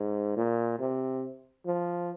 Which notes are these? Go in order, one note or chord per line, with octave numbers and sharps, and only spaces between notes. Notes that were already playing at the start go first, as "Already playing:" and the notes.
Already playing: G#2
A#2
C3
F3